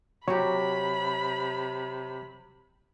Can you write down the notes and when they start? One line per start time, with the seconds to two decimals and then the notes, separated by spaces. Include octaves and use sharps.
0.28 C3 F#3 F#4 G4 C#5 B5